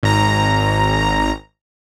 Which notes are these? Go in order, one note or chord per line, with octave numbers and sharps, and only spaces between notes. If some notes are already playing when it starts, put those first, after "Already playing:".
G#1 A#5